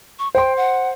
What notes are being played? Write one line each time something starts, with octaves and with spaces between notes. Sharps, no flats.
C#6
C5 G5 C6
F#5